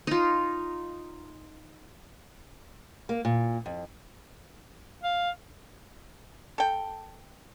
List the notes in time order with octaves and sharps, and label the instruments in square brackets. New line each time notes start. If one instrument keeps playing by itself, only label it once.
[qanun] D#4 F4
[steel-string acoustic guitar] A#3
A#2
F2
[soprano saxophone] F5
[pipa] A4 G5